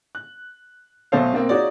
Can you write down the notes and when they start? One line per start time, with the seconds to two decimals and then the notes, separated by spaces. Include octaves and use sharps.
0.15 F#6
1.12 B1 B2 A3 A4 C5 F5
1.33 B2 A#3 C4
1.49 D#4 F4 F#4 G#4 C#5 D5